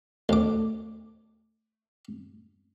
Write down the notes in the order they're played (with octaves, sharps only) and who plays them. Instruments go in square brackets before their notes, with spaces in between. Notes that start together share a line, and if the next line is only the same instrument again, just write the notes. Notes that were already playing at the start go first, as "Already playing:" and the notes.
[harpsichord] D2 D6